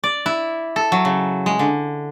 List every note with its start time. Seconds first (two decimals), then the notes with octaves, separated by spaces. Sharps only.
0.04 D5
0.26 E4
0.76 A4
0.92 F#3
1.05 C#3
1.46 G#3
1.59 D3